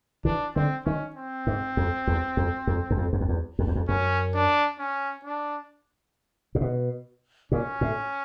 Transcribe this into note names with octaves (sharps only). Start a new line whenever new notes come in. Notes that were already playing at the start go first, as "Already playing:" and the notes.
E3 D4
D3 C4
D#3 C#4
C4
G#2
F2
E2
F2
F2
F#2
F2
F#2
F2
E2
F2
E2
F2
F#2 C#4
D4
C#4
D4
A#2
B2
A#2 C#4
A2